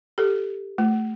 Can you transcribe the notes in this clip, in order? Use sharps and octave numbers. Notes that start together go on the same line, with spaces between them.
G4 A4
A3